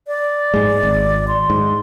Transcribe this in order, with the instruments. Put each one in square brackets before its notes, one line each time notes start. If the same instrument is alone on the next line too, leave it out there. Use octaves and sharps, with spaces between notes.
[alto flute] D5
[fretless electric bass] G#2 G#3
G#1
[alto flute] C6
[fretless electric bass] G#2